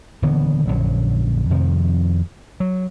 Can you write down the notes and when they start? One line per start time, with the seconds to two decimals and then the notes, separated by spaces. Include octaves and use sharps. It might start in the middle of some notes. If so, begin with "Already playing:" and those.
0.22 D#1 D3 E3 B3
0.68 A#1 F#2 D3 F#3
1.50 F2 C3 D#3 F3
2.60 F#3